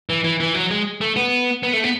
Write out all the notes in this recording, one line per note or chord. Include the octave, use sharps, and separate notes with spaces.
E3
E3
E3
F#3
G#3
A3
B3
B3
A3
B3